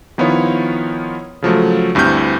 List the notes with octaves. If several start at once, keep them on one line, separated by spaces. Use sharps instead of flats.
D#3 F3 B3 E4 F4 C#5
C#3 F3 F#3 A3
D2 G2 C4 E4 F6 G6